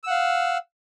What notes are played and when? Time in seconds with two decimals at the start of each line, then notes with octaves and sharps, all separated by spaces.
0.04 E6
0.07 F#5
0.10 F5